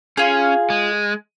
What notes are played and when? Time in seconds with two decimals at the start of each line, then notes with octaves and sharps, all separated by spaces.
0.17 C#4 F4 G#4
0.70 G#3